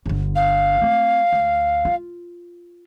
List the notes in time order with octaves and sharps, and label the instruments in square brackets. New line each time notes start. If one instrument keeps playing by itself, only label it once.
[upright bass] G1 D3
[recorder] F5
[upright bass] A3 C4
D2
F4